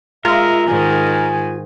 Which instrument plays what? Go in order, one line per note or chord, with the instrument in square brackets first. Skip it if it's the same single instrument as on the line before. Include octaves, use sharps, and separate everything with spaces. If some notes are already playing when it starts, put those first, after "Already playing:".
[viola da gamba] G#3 [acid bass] F4 [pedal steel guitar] A#4 [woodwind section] E5
[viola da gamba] G#2 D#3 [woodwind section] G#5